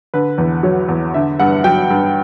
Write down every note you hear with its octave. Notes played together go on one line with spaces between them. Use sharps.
D3 B4
E2
F#3 C#5
E2
D3 E5
G2 F#5
F#3 G5
G2